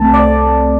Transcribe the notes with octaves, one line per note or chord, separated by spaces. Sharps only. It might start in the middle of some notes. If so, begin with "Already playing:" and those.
Already playing: C2 C3 A3 C4 A5
D5